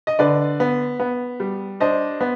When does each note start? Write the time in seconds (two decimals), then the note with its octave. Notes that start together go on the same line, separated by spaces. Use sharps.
0.07 D#5
0.19 D3 B4 D5
0.60 B3
1.00 B3
1.40 G3
1.80 D4 C5 D#5
2.21 B3